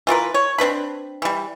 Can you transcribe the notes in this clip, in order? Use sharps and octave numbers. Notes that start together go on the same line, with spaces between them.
E3 F4 A#4 B4
C#5
C4 D4 B4 B5
E3 G3